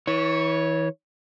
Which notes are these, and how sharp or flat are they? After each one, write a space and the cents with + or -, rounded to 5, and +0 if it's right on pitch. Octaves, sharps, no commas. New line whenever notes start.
E3 -30 C#5 +0